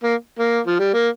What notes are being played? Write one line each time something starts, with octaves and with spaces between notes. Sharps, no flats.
A#3
A#3
F3
G3
A#3